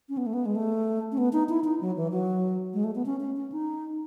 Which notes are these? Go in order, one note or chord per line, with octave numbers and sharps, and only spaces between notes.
C#4
B3
A3
B3
G#3
A3
C#4
B3
D#4
E4
D#4
F#3
E3
F#3
G#3
A3
B3
C#4
C#4
C#4
D#4